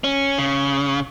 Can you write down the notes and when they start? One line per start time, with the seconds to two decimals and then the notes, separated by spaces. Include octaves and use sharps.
0.04 C#4
0.39 C#3